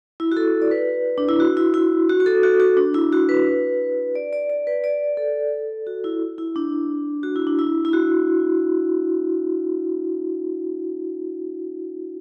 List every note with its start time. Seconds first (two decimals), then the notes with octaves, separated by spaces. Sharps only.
0.20 E4
0.32 F#4
0.37 A4
0.62 D5
0.71 B4
1.18 D4
1.29 E4
1.40 F#4
1.57 E4
1.74 E4
2.09 F#4
2.20 F#4
2.26 A4
2.43 F#4
2.60 F#4
2.77 D4
2.94 E4
3.12 F#4
3.29 B4
4.15 D5
4.33 D5
4.50 D5
4.67 B4
4.84 D5
5.17 A4
5.87 F#4
6.04 E4
6.38 E4
6.56 D4
7.23 F#4
7.36 E4
7.47 D4
7.59 E4
7.85 E4
7.93 F#4